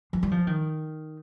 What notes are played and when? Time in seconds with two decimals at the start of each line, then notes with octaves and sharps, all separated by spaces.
0.13 F3
0.23 G3
0.32 F3
0.47 D#3